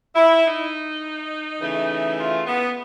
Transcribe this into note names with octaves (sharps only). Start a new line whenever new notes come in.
E4
D#4
C#3 E3 A3
F4
B3